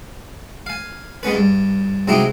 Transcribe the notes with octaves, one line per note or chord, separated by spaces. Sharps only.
F5 G#5
G#3 B3 C#4 B4
G2
C3 F#3 G#3 D#4 E4 G4